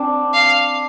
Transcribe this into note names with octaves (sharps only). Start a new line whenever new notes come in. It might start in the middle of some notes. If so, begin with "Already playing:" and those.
Already playing: C4 D4 C5 D5
F5